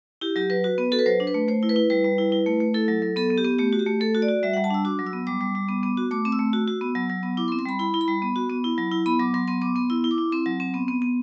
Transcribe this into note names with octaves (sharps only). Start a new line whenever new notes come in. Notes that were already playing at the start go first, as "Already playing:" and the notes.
E4 G4
F#3 G4
F#3 B4
F#4
B3
F#4 A4
B4
F#3 C5
D4
B4
A3
A3 C5
E4
B4
E4
G3 B4
G3
E4
E4
A3
A3
E4 A4
F#3
F#3
B3 A4
B3
G4
B3
A3 G4
F#4
G4
A3
A3 A4
F#4
D5
F#4
G3 E5
G3 F#5
A5
D4 E6
F#4 D6
F#3
E6
B3
G3 D6
G3
G3
B3
B3
F#4
A3 D6
C4
E6
A3
F#4
F#4
B3
F#3
F#3
B3
E4 D6
C6
C4
C6
G3 B5
E4 B5
E4
B5
G3
B3
F#4
B3
E4
F#3
E4
B3 B5
F#3 D6
F#3 C6
B3 C6
B3 D6
B3 C6
E4 E6
E4
D6
E4
C4 C6
F#3
C4
B3
B3
B3